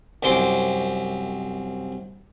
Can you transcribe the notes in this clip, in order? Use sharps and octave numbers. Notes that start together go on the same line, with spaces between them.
C2 F#2 C4 C6 D6